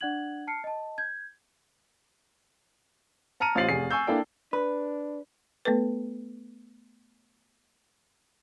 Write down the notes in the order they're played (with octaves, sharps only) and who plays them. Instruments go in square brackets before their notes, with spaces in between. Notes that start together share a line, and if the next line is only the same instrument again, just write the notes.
[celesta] D4 D5 F#5 F#6 G#6 F#7
A5 F6 C7 C#7
D#5 A5
G6 G#6
[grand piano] A5 A#5 F6 C#7 D#7
A1 F4 C5 A6 C7 F#7
F1 G#4 C7
G#5 C#6 E6 G6
A#3 D4 E4 A4 D5 G5
[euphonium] D4 [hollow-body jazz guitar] B4
[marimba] A3 B3 A4 B4